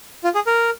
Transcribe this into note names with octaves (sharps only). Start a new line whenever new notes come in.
F4
G#4
A#4